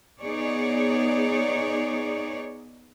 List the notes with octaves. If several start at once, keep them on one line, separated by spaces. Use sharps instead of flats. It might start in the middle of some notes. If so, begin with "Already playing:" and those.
B3 D#4 G#4 C#5 D5